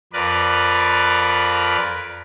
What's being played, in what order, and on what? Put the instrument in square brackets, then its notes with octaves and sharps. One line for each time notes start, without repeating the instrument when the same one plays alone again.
[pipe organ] F2 A#4 B4 D5